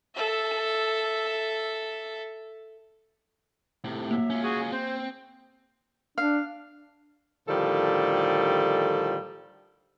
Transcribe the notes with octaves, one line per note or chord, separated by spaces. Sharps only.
A4 E5
A2 C3
F#3 A#3 E5
C#4 F4
F#4 G#4 G#5
C4 C5
D4 F5
A2 D3 D#3 F3 G3 A4